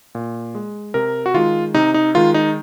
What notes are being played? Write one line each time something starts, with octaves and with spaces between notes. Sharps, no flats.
A#2
G#3
C3 A#4
F#4
D#3 G#3 F4
C3 D#4
D#4
D#3 G#3 F4
D#4